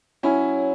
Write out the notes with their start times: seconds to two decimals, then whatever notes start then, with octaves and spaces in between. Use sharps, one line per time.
0.23 F#3 C#4 E4